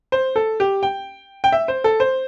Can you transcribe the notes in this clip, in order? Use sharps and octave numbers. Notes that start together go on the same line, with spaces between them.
C5
A4
G4
G5
G5
E5
C5
A4
C5